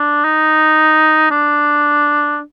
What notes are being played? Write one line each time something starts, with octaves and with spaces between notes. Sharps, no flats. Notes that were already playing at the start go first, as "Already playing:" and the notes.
Already playing: D4
D#4
D4